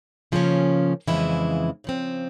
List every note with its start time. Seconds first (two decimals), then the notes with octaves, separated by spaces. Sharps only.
0.32 C#3 F3 A#3 C#4
1.08 F2 C#3 E3 G#3 E4
1.84 C#3 F3 C4